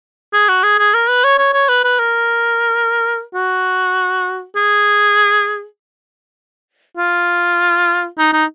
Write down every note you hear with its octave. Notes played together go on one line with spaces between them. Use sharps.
G#4
F#4
G#4
G#4
A#4
B4
C#5
C#5
C#5
B4
B4
A#4
F#4
G#4
F4
D#4
D#4